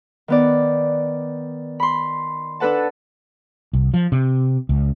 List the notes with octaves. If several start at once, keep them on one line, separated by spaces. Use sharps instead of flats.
D#3 B3 D5
B5 C6
D4 A4 B4 F#5 A5
C2
F3
C3
C#2